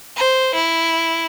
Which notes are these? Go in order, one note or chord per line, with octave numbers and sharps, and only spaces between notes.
C5
E4